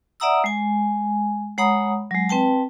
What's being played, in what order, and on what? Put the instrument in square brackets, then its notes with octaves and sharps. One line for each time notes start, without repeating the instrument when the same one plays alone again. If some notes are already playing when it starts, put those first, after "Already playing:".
[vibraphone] D5 E5 F#5 A#5 D#6 E6
G#3 G#5
G#3 C#5 F#5 A#5 B5 D#6
F#3 G#3
C4 B4 G5 A5